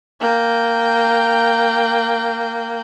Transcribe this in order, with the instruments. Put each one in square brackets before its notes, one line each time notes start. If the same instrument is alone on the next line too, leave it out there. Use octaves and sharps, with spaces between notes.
[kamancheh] A#3 G5